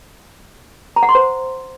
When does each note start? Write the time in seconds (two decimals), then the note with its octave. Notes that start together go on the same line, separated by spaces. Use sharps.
0.96 A#5
1.03 F#5
1.09 C6
1.15 C5